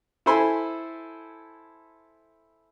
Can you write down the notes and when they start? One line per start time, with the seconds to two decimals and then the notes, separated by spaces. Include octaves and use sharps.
0.26 E4 A4 C5 G#5 B5 C6